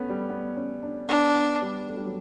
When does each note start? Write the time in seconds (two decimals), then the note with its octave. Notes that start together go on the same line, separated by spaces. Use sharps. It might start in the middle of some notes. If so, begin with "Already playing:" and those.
Already playing: A3 B3 C#4
0.09 G3
0.30 B3
0.56 C#4
0.83 D4
1.09 B3 D4
1.36 B3
1.62 G3
1.88 A3
1.97 G3
2.05 F#3